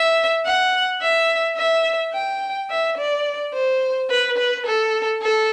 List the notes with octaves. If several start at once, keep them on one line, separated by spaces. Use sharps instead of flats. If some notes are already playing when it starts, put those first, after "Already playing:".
Already playing: E5
F#5
E5
E5
G5
E5
D5
C5
B4
B4
A4
A4